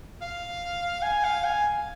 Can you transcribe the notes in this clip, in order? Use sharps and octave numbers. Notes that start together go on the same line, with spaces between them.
F5
G#5
F5
G#5